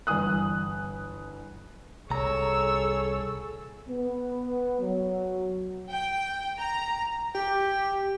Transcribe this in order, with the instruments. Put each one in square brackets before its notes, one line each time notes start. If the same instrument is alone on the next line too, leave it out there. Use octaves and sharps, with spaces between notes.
[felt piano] G1 E3 G#5 D#6 F#6
[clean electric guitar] C2 A#5 [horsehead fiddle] G#4 A4 [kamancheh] C#5 E6
[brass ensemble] B3
F#3
[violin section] G5
A#5
[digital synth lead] G4 [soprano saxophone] G5